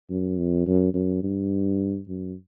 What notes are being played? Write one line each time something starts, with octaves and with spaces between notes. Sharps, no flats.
F#2
F2
F#2
F#2
G2
F#2